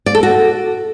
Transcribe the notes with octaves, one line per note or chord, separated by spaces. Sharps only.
D5
A4
F#4